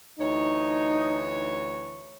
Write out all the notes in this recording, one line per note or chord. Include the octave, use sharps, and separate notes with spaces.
D2 E3 D#4 C#5